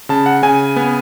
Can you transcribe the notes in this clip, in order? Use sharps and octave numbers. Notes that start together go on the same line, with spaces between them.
C#3 A5
F#5
C#3 G#5
B3